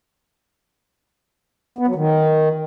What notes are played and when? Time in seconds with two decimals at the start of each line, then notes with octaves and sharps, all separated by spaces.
1.79 B3
1.87 F#3
1.96 D#3